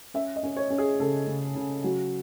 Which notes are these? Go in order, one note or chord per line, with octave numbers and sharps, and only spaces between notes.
C#4 E5
D#5
C#4
C#5
C#4
G#4
C#3 A4
C#3
C#3
F#3